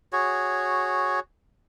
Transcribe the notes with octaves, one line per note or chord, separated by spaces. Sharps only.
F#4 G#4 C#5